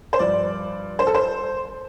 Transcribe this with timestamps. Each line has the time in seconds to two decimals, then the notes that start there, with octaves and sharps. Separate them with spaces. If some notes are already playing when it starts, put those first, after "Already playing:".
0.13 C5
0.19 G2 F3 D5
0.99 C5
1.07 A4
1.15 C5